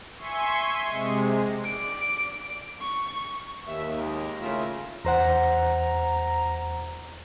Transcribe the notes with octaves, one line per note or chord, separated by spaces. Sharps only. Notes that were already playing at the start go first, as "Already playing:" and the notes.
E5 G#5 C6 C#6
C3 G#3
D5 D7
C#6
D#2 E5
G#3 G4 A#4
A2 C#3 F4 A#4 E5
E2 C5 F#5 A#5